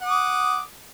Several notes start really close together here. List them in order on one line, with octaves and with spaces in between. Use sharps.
F#5 D#6 D6